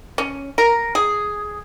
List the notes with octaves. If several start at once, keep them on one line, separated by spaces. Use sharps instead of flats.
C#4
A#4
G#4